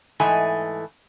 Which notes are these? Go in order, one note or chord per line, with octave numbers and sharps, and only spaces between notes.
G#2 E3 A3 D#5 G#5